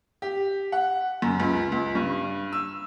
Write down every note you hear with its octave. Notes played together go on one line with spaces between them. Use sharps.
G4
F#5
F#2
C#2
C#2
G2
E6